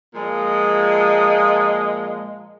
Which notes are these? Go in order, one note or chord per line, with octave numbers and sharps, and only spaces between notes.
A#2 F3 G#3